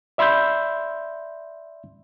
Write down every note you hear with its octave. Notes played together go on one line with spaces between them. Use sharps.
D5 E5 B5 C6 E6 G6